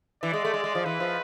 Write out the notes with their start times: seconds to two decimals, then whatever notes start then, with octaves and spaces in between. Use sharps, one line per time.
0.23 E3 D5
0.33 G#3
0.45 A3
0.54 G#3
0.64 G#3
0.75 F3
0.85 E3 B4
1.00 F3